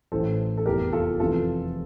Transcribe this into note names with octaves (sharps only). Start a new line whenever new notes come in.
A1 A2 E3 A4 C5
A4
F1 E2 E3 G4 A#4
F4 A4
F1 F2 C3 E3 F4 A4